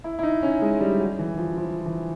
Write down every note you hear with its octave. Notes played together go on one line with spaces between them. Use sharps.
E4
E4
D#4
C#4
G#3
G3
F#3
E3
F3
F3
E3